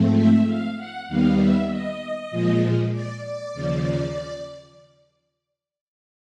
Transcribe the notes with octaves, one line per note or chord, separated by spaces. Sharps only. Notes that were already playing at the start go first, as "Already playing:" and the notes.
Already playing: G#2 F3 A3 C4
E5
F5
F#5
D#2 D#3 G3 B3 F5
E5
D#5
A#2 F3 G#3
D5
D5
D#2 C#3 F3